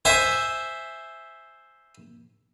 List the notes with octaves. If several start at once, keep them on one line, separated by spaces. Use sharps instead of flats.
C5 E5 G#5